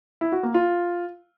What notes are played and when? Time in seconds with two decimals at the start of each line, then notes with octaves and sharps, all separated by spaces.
0.21 E4
0.32 F#4
0.43 A#3
0.54 F4